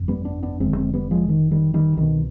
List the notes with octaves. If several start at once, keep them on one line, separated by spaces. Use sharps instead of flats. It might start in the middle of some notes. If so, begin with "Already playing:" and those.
Already playing: G1 F2 C3
G3 B3
B3 D4
B3 D4
F1 D#2 D3 G#3 C4
G#3 C4
G3 B3
F3 G#3
D#3
D#3 G3
D#3 G3
C2 B2 D#3